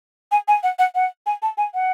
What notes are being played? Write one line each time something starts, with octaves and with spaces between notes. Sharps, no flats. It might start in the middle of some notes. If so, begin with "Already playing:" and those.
G#5
G#5
F#5
F#5
F#5
G#5
A5
G#5
F#5